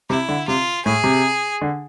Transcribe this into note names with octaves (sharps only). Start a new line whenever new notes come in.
C3 E4
D3
C3 F4
A2 G#4
C3
D3